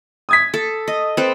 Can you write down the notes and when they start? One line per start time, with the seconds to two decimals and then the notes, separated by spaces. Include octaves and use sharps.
0.29 D#6 G#6 B6
0.54 A4
0.88 D#5
1.17 C4 A4 B4